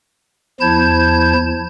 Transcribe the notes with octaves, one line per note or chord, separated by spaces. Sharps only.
E2 F3 E4 A5 G6 G#6